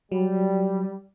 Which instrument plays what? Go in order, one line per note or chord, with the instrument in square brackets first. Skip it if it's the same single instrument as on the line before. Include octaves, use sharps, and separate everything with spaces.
[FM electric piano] F#3 [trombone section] G3